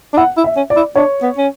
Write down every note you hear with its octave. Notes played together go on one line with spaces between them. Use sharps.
D4
E4 F#5
E4
E5
C#4
D5
E4
D4 C#5
B3
C#4